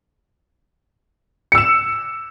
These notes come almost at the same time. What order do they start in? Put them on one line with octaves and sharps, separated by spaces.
C#7 E6 E7